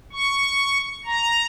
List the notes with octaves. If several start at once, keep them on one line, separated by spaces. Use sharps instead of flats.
C#6
A#5